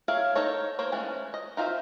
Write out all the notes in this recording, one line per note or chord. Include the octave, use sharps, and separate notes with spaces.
G#4 A#4 C#5 E5 F5
D#4 A4 A#4 C#5
A#3 C5 C#5
E3 G#3 A3 C#4
D#5
D#4 F4 A#4 C5 E5